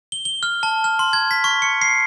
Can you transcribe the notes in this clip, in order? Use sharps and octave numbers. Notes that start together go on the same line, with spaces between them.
G7
G7
F6
A5
F6
C6
G#6
B6
C#6
C#7
C7